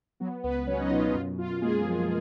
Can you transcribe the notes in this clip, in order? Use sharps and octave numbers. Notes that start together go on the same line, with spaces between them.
F#3 B3 F#4
C#2 B3 B4
F#3 C#4 C#5
D#4 D#5
B2 F4
F4
F#2 F4
F#2 F4
G#3 A#3 G#4
F3